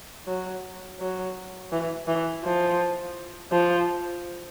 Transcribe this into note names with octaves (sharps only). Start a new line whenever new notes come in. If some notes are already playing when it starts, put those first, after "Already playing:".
F#3
F#3
E3
E3
F3
F3